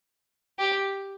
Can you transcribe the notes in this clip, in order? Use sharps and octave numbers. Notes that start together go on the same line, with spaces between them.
G4